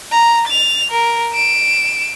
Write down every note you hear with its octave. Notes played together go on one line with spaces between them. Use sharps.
A#5
A6 F7
A#4
D7 E7